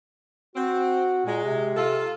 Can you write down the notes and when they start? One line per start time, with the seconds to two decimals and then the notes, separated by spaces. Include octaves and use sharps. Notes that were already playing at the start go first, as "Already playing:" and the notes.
0.56 C4 F#4
1.26 A#2 G#3
1.44 C3
1.75 F4 A4